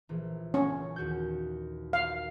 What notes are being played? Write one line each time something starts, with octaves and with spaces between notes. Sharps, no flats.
A#1 E3
C#4 C#5
D#2 F#4 G6
F5